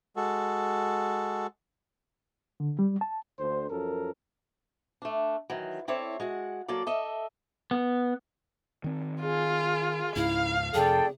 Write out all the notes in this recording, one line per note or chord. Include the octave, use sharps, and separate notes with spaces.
G#3 F#4 A4
D3
G3
A5
D2 D3 C5
F#2 F3 A4 A#4
A3 D4
D#3 E3 F#3
C4 E4 A4 C#5 D5
G#3 F#4 F#5
F#3 A#3 A4 D5
A4 D#5 E5
B3
D#3 C4
F4 G#4
C#2 G#2 E4 F5
F2 C3 G#4 A4 D5 G5